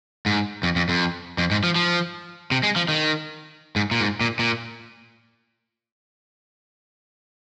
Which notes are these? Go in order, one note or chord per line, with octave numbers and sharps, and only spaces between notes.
G#2
F2
F2
F2
F2
G#2
F3
F3
C3
G#3
F3
D#3
G#2
A#2
G#2
A#2
A#2